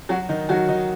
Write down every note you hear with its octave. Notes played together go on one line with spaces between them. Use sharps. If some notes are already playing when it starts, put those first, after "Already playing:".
F#3 F#4
D#3 D#4
D#3 F#3 F#4
D#3 D#4